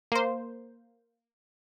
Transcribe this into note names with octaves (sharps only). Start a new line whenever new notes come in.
A#3 C5